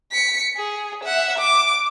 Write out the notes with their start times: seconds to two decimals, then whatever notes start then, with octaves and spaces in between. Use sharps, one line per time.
0.12 B6 C#7
0.57 G#4
1.04 E5 F#5
1.38 D6